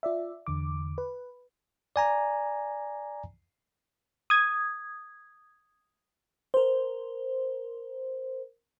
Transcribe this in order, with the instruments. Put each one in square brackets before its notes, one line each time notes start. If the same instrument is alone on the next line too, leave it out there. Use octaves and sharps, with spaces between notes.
[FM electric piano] F4 D5 E5
E2 D3 D6
B4
[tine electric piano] D5 G#5 A#5
[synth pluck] D#6 G#6
[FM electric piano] A#4 C5